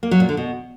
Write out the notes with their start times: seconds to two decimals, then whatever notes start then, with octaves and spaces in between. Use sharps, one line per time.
0.03 A#3
0.11 F#3
0.20 A#2
0.29 D3
0.37 B2